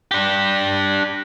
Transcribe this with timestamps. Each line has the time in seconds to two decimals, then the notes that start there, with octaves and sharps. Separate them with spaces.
0.11 D4 G4